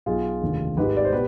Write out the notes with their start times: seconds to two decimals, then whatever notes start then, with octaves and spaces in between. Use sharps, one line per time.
0.06 B1 B2 F4 G#4
0.42 F1 D#2 D3
0.77 G#1 G#2 D#3 G4 B4
0.97 D5
1.05 C5
1.12 B2 G4 B4